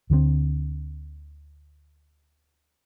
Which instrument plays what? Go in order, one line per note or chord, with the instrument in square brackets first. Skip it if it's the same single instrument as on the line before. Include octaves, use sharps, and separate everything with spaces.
[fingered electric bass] D2 D3 D#3 C4